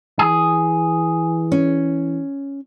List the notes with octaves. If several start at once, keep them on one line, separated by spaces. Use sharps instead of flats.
E3 G#4
C#4